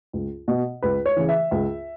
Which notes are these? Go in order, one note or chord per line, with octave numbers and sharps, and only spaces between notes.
C#2
B2
C#2 B4
C#5
C#3 E3
E5
C#2